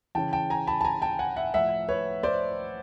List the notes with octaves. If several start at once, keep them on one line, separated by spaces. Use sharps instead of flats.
C#3 E3 G5 A5
G5 A5
G#5 A#5
A5 B5
A5
G#5 A#5
G5 A5
F#5 G#5
E5 F#5
A2 F3 E5 F#5
B4 C#5
C5 D5